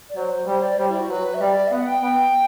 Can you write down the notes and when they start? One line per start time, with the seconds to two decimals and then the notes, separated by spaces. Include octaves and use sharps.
0.09 D5
0.16 F#3 C5
0.47 G3 C5
0.63 D5
0.78 G3 C5
0.89 E4
0.99 F#4
1.09 F#3 B4
1.34 E5
1.41 G3 D5
1.67 E5
1.71 B3 F#5
1.87 G5
2.03 B3 G5